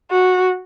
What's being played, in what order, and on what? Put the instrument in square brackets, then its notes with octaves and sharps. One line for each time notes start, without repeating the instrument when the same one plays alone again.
[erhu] F#4